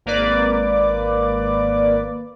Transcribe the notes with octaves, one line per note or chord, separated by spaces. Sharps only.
G#1 A#3 B4 D5 D6